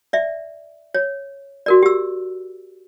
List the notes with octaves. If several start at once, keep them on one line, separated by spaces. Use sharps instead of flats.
D5 E5
C#5
F#4 A#4 D5
G4 E6